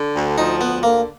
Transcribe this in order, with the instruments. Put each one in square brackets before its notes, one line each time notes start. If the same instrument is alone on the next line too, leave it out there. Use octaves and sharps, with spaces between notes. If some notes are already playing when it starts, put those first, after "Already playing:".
Already playing: [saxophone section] D3
D2
[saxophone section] F3 [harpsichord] D#4
[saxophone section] D2 [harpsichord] B3
[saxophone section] D3 [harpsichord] A#3